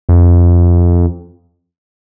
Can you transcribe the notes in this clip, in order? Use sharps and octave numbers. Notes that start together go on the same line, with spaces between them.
F2